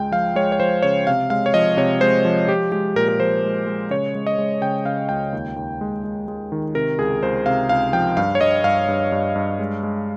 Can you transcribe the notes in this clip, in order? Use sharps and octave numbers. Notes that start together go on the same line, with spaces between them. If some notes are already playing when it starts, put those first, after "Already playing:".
Already playing: C#2 G#3 G5
F3 F5
G#3 C#5
C#5
F3 C5
C#3 C#5
C3 F5
G#3 F5
C#5
F3 D#5
C3 C#5
G#3 C5
F3
F3 G4
G#3 G4
A#2 A#4
A#4
F3 C5
G#3
G#3
C#3 C#5
G#3
D#5
G#3
C#3 G5
C#3 F5
C#2 G5
D#2
D#2
G#3
G#3
G#3
D#3
C3 A#4
C#2 G#4
C#2 C5
C3 F5
C#2 F5
F3 G5
G2 F5
C#5
G2 D#5
G2 F5
G2
G2
G2
G#3
G#3